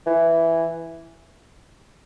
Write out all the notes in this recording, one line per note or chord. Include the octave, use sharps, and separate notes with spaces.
E3